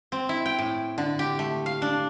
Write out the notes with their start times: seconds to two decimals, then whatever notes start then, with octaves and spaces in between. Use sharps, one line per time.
0.12 C4
0.29 E4
0.46 G5
0.59 A2
0.98 D3
1.19 G4
1.39 A3
1.66 F5
1.82 D4